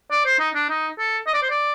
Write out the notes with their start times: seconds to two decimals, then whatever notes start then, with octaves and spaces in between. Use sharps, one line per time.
0.11 D5
0.26 C5
0.40 D#4
0.55 D4
0.69 D#4
0.98 A4
1.27 D#5
1.34 D5
1.43 C5
1.50 D5